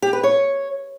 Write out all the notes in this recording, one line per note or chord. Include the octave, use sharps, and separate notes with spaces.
G4
B4
C#5